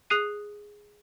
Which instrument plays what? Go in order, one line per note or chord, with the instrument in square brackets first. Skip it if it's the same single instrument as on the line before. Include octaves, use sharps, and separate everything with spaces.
[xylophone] G#4 D#6 F#6 C7 D#7